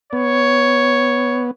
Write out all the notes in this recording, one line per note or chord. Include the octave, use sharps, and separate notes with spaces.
B3 C#5